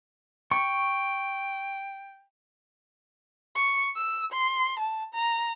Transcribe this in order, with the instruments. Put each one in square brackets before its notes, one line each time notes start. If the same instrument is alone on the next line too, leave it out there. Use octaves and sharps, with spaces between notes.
[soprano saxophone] G5 [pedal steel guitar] C#6
[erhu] C#6
E6
C6
A5
A#5